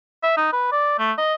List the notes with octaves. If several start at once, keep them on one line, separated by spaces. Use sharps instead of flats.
E5
D#4
B4
D5
A3
D#5